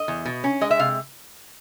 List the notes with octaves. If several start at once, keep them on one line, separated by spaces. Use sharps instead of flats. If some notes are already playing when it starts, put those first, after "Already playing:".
Already playing: D#5
E2
B2
C#4
G#3 D#5
E5
C3 F5